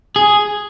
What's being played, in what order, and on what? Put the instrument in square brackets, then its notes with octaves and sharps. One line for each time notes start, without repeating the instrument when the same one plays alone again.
[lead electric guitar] G#4